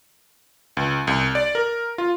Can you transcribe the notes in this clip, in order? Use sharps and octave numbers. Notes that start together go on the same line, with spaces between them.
C#2
C2
D5
A#4
F4